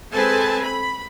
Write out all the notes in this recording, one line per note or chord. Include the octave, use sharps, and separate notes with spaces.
G#3 C4 A4 B4 G#5 A5
B5